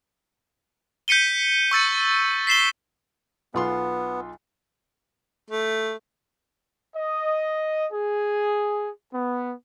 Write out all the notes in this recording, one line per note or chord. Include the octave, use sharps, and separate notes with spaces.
G6 B6 C#7 D#7 G7
C#6 E6 A6 C#7
B6 C7 E7 G7
B1 B3 F4 C6
A3
D#5
G#4
B3